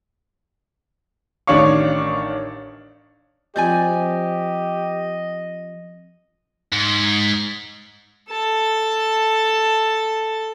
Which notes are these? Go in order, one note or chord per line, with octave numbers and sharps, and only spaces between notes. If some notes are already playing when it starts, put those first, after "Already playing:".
A1 D#3 D4 C#5 F5 C#6
F3 C4 F4 G4 C5 D5 D#5 G#5
G#2
A4 A5